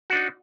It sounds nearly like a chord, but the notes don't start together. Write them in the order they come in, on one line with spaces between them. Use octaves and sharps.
F#4 D4 D#4